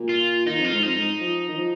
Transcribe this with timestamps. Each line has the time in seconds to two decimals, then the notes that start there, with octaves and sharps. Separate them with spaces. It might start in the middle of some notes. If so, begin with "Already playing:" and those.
Already playing: A#2
0.09 F4
0.46 D#3 D#4
0.59 F2
0.64 F4
0.71 G#2
0.83 F2 D#4
0.95 G#2
1.21 F3
1.49 D#3
1.58 F3